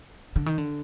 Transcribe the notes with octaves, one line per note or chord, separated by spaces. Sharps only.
D3
D#3
D3